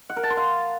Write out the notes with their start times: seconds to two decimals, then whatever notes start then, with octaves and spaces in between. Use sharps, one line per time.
0.10 F#5
0.16 A#4
0.23 A5
0.30 C6
0.37 F5